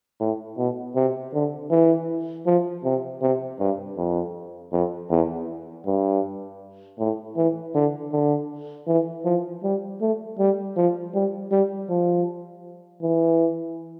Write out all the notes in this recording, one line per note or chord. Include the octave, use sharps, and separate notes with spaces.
A2
B2
C3
D3
E3
F3
C3
C3
G2
F2
F2
E2
G2
A2
E3
D3
D3
E3
F3
G3
A3
G3
F3
G3
G3
F3
E3